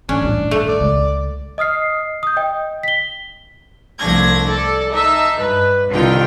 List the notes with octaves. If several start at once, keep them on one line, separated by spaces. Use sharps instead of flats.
A1 C#4 D4
D#1 A1 G2
A3
D5
C#2
D#5 D#6 F6 C7
D#6 G6
D#5 G5
B6 G7
C2 F3 A3 D4 G#6 A#6
A4 D5
D#4 E5 A5
G2 B4
C2 D3 D#3 F4 G5